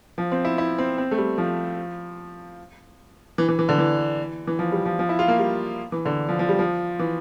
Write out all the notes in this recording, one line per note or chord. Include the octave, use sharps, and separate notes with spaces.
F3
C4
E4
E4
C4
C4
A3
G3
F3
E3
E3
E3
D3
E3
E3
F3
G3
F3
F3
E4
F4
A#3
G3
E3
D3
F3
F3
G3
F3
E3